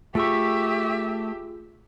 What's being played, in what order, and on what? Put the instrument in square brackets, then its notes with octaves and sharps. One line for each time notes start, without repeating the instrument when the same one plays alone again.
[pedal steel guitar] A3 C#6 [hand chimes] F4 G#4 E6 [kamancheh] G4 E5